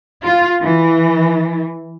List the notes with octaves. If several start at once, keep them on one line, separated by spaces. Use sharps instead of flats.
F4
E3